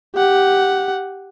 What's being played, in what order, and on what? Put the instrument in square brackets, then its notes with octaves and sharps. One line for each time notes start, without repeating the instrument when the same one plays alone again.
[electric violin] G4 F#5